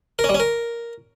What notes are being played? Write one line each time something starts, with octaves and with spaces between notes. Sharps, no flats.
A#4
C#4
G3
C#4
A#4